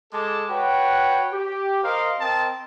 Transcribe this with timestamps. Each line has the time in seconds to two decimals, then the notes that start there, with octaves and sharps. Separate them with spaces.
0.13 G#3 A4 A5 D6
0.50 F#4 B4 C#5 G5
1.33 G4
1.83 A#4 C5 D#5 F5
2.21 C4 A#4 D#5 G5 A5